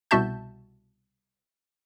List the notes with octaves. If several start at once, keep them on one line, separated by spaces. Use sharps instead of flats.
C2 B2 F#4 E5 A5 G6